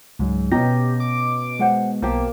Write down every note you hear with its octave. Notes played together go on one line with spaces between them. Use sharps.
C#2 G#2 F#3
B2 C#4 G4 D#5 A#5 A#6
D6
G#3 C5 F#5 G#5
B1 A#3 G4 C5 A5